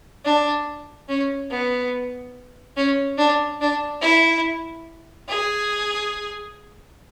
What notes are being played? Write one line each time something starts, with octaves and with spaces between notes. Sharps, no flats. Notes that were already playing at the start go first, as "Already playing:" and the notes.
D4
C#4
B3
C#4
D4
D4
E4
G#4